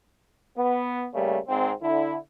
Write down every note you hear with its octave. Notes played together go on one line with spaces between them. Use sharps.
B3
C#3 G3 A3 A#3
G#1 G#2 C4
D3 E4